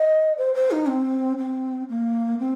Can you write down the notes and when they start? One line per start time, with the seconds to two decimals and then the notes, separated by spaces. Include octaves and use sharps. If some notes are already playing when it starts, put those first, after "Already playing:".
Already playing: D#5
0.38 C5
0.54 C5
0.71 D#4
0.88 C4
1.38 C4
1.89 A#3
2.39 C4